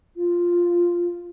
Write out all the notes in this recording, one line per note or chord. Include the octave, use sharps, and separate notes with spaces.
F4